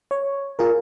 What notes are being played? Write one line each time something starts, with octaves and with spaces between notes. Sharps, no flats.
C#5
F4 G#4 A#4